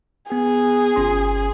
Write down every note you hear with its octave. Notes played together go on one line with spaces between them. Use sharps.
B3 G#4
G1 C#4 C6